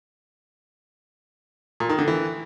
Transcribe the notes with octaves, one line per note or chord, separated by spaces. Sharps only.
A#2
D#3
D3
E3